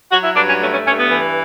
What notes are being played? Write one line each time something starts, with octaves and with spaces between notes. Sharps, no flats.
F#3 F#4
E4
G2 D4
C#4
A3 C#4
C#4
G2 C#4
B3
E3